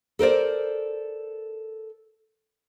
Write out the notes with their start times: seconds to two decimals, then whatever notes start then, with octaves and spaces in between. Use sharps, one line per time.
0.19 A4 A#4 C5 D5